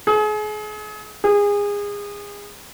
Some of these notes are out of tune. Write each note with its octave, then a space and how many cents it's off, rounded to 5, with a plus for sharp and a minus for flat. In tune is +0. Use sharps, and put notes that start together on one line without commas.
G#4 +35
G#4 -25